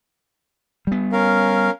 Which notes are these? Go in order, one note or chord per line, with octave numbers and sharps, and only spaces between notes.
G3 B3
C#4 A#4 F5